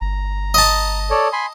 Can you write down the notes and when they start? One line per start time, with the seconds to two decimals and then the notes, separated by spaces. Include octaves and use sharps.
0.01 G1 A#5
0.54 D#5 A5
1.10 A4 C#5 D5
1.33 G#5 B5 C6